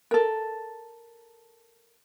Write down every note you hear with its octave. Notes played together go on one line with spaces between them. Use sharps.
A4 A#4